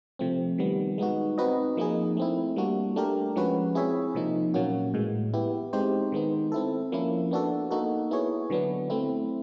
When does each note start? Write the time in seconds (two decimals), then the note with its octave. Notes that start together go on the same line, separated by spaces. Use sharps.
0.19 C3 F3 A3 C4
0.58 D#3 G3 B3
0.98 G#3 B3 D#4 F#4
1.38 C4 D#4 F#4 B4 D#5
1.77 F3 A#3 D#4 G#4
2.17 A3 C4 E4
2.56 G3 A#3 D4 F#4
2.96 A3 D4 G4 A#4
3.36 F3 G#3 C#4 F#4 B4
3.75 C4 E4 G#4 C#5 E5
4.15 C3 F3 A#3 D#4
4.54 A#2 F#3 A#3 C#4 F#4
4.94 A2 E3 G#3
5.34 B3 E4 G4
5.73 G#3 C4 D#4 G4 C5
6.12 D#3 G#3 B3 D#4
6.52 C4 E4 A4
6.92 F3 A#3 C#4 E4
7.31 B3 D4 F#4 A4
7.71 A#3 D#4 F#4 A4
8.11 B3 E4 G#4 C#5
8.50 D3 F#3 B3 D4
8.90 A3 C4 E4